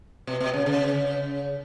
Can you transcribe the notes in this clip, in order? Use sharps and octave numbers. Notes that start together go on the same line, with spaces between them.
B2
B2
C#3
C#3